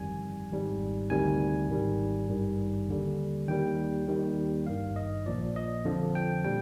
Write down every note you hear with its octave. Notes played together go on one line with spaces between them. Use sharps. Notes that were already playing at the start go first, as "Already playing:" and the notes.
Already playing: G1 F2 D#3 G3 G#5
G#1 G#2 G3
D2 C3 D#3 G3 G#5
G#1 G#2 D#3 G3
G#1 G2 D#3 G3
D#2 D3 G3
D#2 D#3 G3 G5
D#2 D#3 G3
G#1 G2 D#3 F5
D#5
A#1 A#2 F3 D5
D#5
F2 D3 F3
G5
A#2 G3 G5